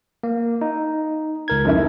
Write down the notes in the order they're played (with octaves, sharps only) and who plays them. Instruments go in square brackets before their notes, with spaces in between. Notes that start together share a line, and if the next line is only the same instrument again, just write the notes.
[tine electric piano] A#3
D#4
C#2 A#4 G#6
[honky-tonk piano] F1 C#3 E4